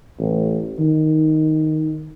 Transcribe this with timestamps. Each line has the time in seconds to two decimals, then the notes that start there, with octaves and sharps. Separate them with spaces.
0.19 A1
0.79 D#3